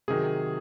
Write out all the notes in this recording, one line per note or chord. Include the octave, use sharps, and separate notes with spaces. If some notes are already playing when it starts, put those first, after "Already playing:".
C3 D#3 F#3 G#4